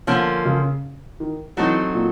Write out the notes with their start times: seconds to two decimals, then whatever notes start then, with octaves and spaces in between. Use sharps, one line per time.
0.07 D3 F3 A#3 C#4
0.45 C#3
1.20 D#3
1.57 E3 F#3 A3 C4 D#4
1.94 A#2